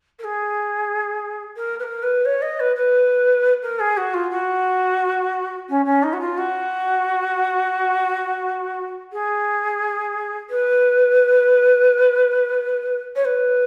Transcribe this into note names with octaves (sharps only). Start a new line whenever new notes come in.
A#4
G#4
A#4
B4
A#4
B4
C#5
D#5
B4
B4
A#4
G#4
F#4
F4
F#4
C#4
C#4
D#4
F#4
F4
F#4
G#4
B4
C#5
B4